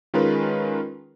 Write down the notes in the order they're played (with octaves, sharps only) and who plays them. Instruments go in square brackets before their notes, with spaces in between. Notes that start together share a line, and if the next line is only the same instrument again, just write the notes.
[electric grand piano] D#3 G#3 C#4 F4 A#4 B4